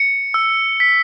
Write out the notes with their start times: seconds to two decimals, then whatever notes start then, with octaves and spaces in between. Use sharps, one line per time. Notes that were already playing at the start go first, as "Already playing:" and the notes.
Already playing: C#7
0.34 E6
0.80 B6